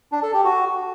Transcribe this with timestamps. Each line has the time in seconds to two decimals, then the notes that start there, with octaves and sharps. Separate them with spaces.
0.12 D4
0.23 A4
0.34 G4
0.44 F#4